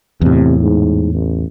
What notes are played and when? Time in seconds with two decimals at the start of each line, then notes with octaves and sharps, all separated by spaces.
0.21 E2 A2 C3
0.62 G#2
1.14 A1